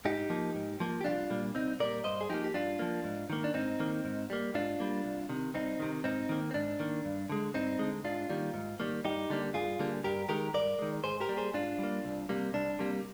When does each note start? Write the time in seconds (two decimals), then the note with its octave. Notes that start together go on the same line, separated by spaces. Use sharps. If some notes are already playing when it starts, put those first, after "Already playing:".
0.05 G#2 D#4 G4
0.30 F3 A#3
0.55 G#2
0.80 F3 A#3
1.01 G4
1.04 C2 D4 F4
1.30 A#2 G3 A#3
1.55 C2 C4 D#4
1.80 A#2 G3 A#3 A#4 D5
2.04 G2 C5 D#5
2.21 G#4
2.29 F3 A#3 D#4 G4
2.44 G4
2.54 G2 D4 F4
2.79 F3 A#3
3.04 G#2
3.30 D#3 A#3
3.44 D4
3.54 G#2 C4 D#4
3.80 D#3 A#3
4.05 G#2
4.30 G3 A#3
4.54 G#2 D4 F4
4.80 G3 A#3
5.05 C2
5.29 C3 D#3
5.54 C2 C4 D#4
5.80 C3 D#3
6.04 G#2 C4 D#4
6.29 D#3 A#3
6.51 C4
6.54 G#2 D4
6.80 D#3 A#3
7.05 G2
7.30 D3 G#3
7.54 G2 C4 D#4
7.79 D3 G#3
8.04 G#2 D4 F4
8.30 D#3 G3 A#3
8.54 G#2
8.80 D#3 G3 A#3
9.04 G2 D#4 G4
9.30 D3 G3 A#3
9.54 G2 F4 G#4
9.79 D3 G3 A#3
10.04 G2 G4 A#4
10.29 D#3 G#3 G4 A#4
10.54 G2 A#4 D5
10.79 D#3 G#3
11.04 G#2 G#4 C5
11.20 G4 A#4
11.29 G3 A#3
11.37 G#4 C5
11.54 G#2 D4 F4
11.79 G3 A#3
12.05 C2
12.29 C3 G3 A#3
12.54 C2 D4
12.79 C3 G3 A#3